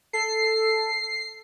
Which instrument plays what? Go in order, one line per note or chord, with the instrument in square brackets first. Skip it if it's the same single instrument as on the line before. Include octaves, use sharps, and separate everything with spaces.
[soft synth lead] A4 [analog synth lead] C7